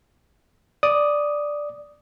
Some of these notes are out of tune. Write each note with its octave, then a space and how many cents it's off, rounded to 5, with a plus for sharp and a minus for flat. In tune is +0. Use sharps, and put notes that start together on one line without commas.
D5 +0 D#6 +0